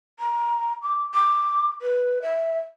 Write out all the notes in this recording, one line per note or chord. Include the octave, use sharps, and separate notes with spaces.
A#5
D6
D6
B4
E5